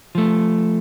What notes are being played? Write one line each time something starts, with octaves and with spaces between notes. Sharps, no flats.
F3 A3